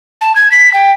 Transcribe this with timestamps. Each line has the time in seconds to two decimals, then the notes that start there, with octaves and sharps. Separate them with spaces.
0.21 A5
0.36 G#6
0.52 B6
0.74 G5